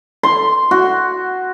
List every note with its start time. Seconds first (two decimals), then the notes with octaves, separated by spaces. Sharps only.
0.23 C6
0.71 F#4